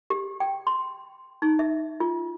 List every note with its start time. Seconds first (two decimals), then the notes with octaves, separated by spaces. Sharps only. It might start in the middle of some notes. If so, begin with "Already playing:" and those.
0.10 G4
0.40 G5
0.67 C6
1.42 D#4
1.59 E5
2.00 F4